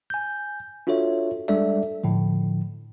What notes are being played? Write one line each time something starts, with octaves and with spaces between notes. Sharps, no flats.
G#5 G6
D4 F4 F#4 A4 C#5 E5
G3 G#3 D4 A4 D5 E5
A2 D3 F3